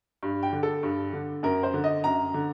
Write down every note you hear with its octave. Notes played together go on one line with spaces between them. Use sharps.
G2
G5
D3
A4
G2
D3
F#2 A#4
C5
D3
D#5
F#2 A#5
D3